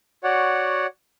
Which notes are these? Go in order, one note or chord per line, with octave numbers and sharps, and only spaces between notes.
F#4 C#5 D5 F#5